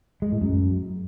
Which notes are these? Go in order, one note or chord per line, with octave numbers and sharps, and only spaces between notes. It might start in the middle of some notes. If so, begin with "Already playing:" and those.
G#3
A2
F#2